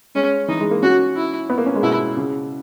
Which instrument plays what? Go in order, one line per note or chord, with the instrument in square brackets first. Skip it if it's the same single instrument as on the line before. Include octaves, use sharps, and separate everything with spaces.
[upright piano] G#3 [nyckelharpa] C#4
[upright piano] E3 [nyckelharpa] D#4
[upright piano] G#3
A#3
[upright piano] C#4 [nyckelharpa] F#4
[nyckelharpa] E4
[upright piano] B3
A#3
C#4
G#3
[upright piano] B2 [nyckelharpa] E4
[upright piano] C#3